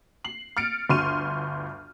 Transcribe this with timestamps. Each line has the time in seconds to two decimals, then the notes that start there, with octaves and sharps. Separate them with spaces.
0.24 C7 F#7
0.57 F6 A6 C#7 D7
0.90 G1 D2 C6 C#6 F6 D#7